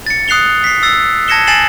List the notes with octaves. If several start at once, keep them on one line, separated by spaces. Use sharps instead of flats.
A6 C#7
D#6 F#6 C7 F7 G7
B6 C7
E6 A6 C7
A5 G#6 A#6 C#7 E7 G7
G#5 A6 C7 E7 F#7